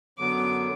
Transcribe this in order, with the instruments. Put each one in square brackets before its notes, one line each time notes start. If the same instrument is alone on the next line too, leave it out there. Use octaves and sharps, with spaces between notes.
[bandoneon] F#2 D3 F#3 B3 [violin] D6